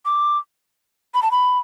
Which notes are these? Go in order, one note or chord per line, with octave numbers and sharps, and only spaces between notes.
D6
B5
A5
B5